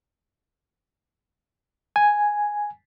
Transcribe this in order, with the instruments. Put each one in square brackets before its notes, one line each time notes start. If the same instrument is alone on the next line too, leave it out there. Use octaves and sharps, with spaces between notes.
[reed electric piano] G#5